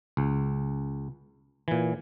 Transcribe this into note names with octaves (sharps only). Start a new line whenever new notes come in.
C#2
A#2 E3